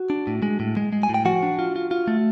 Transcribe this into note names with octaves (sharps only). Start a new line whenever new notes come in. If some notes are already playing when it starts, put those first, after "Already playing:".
Already playing: F#4
D4
A2
G#3
A2
G#3
G#3
G#5
A2
G5
F3 F#4 F#5
D4
F4
F4
F4
A3